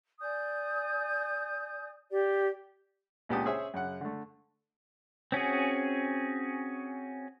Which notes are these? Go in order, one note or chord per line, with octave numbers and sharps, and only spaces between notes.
D5 G#5 D#6 G6
G4 D5
C#2 A#2 B3 G4 A5 D#6
C#4 G#4 C5 E5
F#2 C#3 F#5
D3 A3
C4 C#4 F#4 G#4